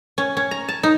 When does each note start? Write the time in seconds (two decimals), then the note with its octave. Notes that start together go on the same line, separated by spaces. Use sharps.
0.18 C#4
0.37 C#4
0.51 A#5
0.69 A5
0.83 D#4